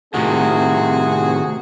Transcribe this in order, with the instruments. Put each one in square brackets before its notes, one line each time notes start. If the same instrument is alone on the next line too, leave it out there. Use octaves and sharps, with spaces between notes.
[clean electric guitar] A2 C3 D#3 [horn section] C4 F#4 G#4